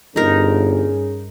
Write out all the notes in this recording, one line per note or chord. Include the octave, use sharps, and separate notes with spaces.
G1 G2 C#4 D#4 G#4 A#4